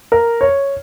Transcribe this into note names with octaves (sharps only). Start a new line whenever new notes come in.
A#4
C#5